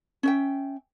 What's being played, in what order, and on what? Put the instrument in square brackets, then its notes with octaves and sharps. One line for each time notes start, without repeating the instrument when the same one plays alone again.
[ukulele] C#4 E5 G5